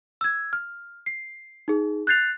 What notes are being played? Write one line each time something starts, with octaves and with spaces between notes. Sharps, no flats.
E6 G#6
F6
C7
D#4 G#4
F#6 G6 A6 C7 F7